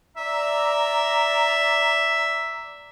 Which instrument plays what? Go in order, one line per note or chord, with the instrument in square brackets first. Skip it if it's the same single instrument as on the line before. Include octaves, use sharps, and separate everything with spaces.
[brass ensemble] D5 A#5 [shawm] E5